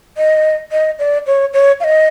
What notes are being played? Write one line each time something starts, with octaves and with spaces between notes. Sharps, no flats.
D#5
D#5
D5
C#5
C#5
F5
D#5